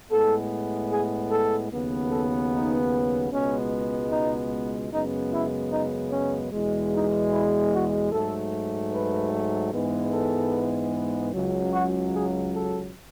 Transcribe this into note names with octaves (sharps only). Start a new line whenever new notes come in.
A2 G#3 B3 A4
G#4
A4
D#2 C#3 F#3 B3
A4
D#4
C#2 B2 G#3 B3 C#4
D#4
F#2 C#3 G#3 B3 D#4
E4
D#4
C#4
E2 B2 G#3
D#4
E4
F#4
G#2 F#3 A3 A4
B4
G#2 E3 G#3 B3
A4
C#2 C#3 F#3
F#4
G#4
A4